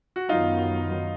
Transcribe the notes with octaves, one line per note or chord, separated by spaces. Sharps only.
F#4
F#2 D#3 F#3 B3 D#4 F4